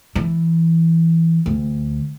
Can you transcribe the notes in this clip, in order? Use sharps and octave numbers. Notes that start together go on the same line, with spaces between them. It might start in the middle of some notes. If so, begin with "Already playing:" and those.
E3
D2